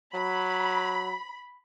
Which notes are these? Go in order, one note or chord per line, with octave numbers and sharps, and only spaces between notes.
F#3 B5